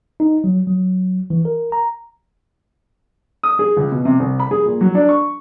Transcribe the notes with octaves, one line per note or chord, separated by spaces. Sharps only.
D#4
F#3
F#3
E3
A#4
A#5
D#6
G#4
C#2
B2
C3
C2
B5
G#4
A#2
F#3
D4
C#6